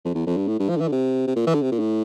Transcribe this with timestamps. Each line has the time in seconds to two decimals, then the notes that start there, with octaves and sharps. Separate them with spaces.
0.05 F2
0.15 E2
0.26 F2
0.37 G2
0.47 A2
0.59 G2
0.69 F3
0.76 D3
0.81 E3
0.88 D3
0.92 C3
1.27 C3
1.36 A#2
1.47 E3
1.54 D3
1.62 C3
1.71 A#2
1.79 A2